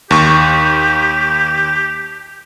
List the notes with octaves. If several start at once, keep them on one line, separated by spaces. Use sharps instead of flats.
D#2 G4 C#6